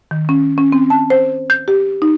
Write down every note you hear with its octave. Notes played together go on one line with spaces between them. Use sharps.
D#3
C#4
C#4
C4
A5
C5
G6
G4
D#4